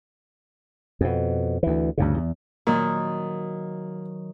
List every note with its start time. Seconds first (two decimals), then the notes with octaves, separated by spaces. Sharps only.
1.01 F2 B2
1.63 D2 E3
1.98 D2 G2 C#3
2.18 E2
2.67 A#2 D#3 F#3